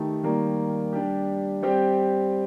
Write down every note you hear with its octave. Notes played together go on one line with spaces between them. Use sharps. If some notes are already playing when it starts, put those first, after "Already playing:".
Already playing: D#3 A3 D#4 G4
D#3 G3 A#3
G3 D4 G4
G3 C4 G4